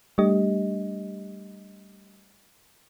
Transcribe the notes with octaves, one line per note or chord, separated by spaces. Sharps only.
G3 A3 D4 G4 D#5